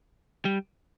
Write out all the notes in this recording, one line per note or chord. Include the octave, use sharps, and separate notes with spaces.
G3